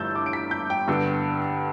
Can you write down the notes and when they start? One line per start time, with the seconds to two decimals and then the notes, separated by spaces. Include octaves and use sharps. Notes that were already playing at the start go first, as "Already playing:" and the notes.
Already playing: G1 G2 E3 A3 E6 G6 A6
0.15 D6
0.26 D7
0.33 B6
0.51 G6
0.70 G5
0.88 G2 D3 B3